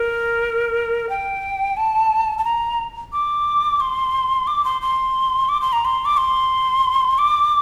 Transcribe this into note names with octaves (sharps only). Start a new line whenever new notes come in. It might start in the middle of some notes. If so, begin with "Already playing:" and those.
Already playing: A#4
G5
A5
A5
A#5
D6
C6
D6
C6
C6
D6
C6
A#5
C6
D6
C6
D6